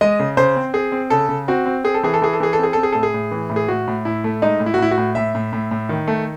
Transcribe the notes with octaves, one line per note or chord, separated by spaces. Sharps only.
G#3 D#5
C#3
C#3 C5
C4
C4 G#4
C4
C#3 A4
C#3
C4 F#4
C4
C4 G#4
A4
E3 G#4
A4
E3 G#4
A4
E3 G#4
A4
C4
G#4
C4 A4
G#4
A2 A4
G#4
A2
E3
A2
G#4
A2 F#4
A2
A2 E4
A3
G#3 D#4
A2
E4
F#4
A2 E4
F#4
A2
A2 E5
A2
A2
A2
D#3
A3